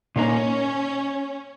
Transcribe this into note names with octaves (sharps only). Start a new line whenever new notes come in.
A#2 A#3 C#4 D#4